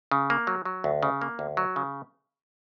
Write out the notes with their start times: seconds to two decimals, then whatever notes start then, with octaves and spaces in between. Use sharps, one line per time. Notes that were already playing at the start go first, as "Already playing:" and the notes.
0.11 C#3
0.30 A#3
0.47 F#3
0.65 F#3
0.84 D2
1.03 C#3
1.21 A#3
1.39 D2
1.57 F#3
1.76 C#3